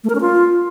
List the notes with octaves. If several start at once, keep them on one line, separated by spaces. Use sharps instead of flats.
A3
A#4
C#4
F4